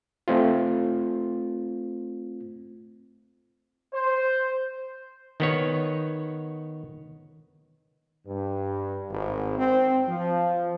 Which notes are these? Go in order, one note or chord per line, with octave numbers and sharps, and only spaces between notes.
A3 C4 F4
C5
D#3 B3 C#5
G2
G#1
C4
F3